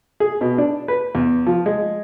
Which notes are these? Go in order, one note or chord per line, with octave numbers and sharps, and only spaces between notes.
G#4
B2
D4
B4
E2
F3
G#3